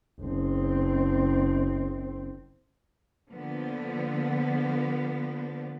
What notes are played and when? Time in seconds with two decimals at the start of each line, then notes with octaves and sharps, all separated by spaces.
0.21 F#1 C4
3.31 D3 F3 A#3 B3